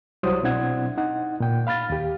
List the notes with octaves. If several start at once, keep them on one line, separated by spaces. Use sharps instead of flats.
C2 F#3 G3 E4 C5 D#6
B2 C4 D4 E4 F#5 G#6
D#4 F#5
A#2 G5
F5 B5 F6 A6
D#2 G4